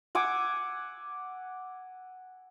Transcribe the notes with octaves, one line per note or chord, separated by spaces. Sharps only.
F#5 G#5 D6 E6